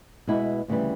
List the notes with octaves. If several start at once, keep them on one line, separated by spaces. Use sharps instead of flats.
B2 G#3 B3 E4
D2 C#3 E3 G3